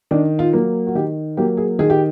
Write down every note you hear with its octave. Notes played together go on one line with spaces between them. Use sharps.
D#3 D4
F4
F#3 A#3
F#4
D#3 G4
F#3 A#3 G4
G#4
D#3 G#4
G4